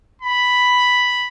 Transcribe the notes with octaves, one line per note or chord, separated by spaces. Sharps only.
B5